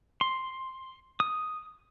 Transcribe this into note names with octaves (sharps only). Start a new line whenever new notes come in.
C6
D#6